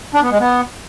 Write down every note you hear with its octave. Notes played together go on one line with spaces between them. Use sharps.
D4
B3
G#3
B3